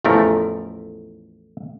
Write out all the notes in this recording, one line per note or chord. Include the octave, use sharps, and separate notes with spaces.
A1 E2 F3 A3 A#4